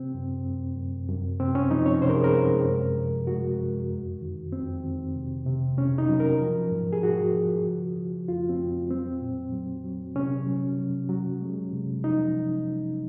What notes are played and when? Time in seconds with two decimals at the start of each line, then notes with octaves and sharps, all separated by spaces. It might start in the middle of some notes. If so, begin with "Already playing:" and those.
Already playing: C3 C4
0.15 F#2
0.46 F#2
0.77 F#2
1.09 F#2
1.40 C3 C4
1.55 C#4
1.71 F3 D#4
1.86 C#5
2.02 C3 C5
2.09 A#4
2.16 G#4
2.24 A#4
2.33 G#3
2.65 F#2
2.96 F3
3.27 G#3 F#4
3.58 F#2
3.90 F2
4.21 D#3
4.52 F2 C4
4.84 D#3
5.16 C3
5.46 C3
5.78 C3 C#4
5.98 D#4
6.09 F#3
6.20 A#4
6.41 F3
6.71 G#2
6.93 G#4
7.03 F3 F#4
7.34 F3
7.65 C#3
7.97 F3
8.28 F2 F4
8.49 C4
8.59 F2
8.90 F#3 C4
9.22 A#2
9.53 F#3
9.84 F#3
10.16 C3 C#4
10.47 F#3
10.78 F#3
11.09 F#3
11.41 G#3
11.73 C3
12.04 F3 D#4